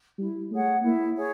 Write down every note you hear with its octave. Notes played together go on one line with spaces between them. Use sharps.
G3 E4
A3 G#4 C#5 F#5
A#3 E4
G#4 C#5